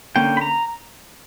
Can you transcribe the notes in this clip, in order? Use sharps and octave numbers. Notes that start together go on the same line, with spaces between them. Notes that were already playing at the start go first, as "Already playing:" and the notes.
D3 A#3 C#4 G5
B5
A#5